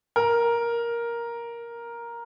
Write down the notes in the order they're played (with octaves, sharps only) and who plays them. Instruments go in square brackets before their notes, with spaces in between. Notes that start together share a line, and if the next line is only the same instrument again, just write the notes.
[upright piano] A#4